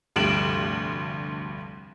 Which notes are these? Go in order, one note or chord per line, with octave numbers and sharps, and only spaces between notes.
F1 D2 G2 D7 E7 F#7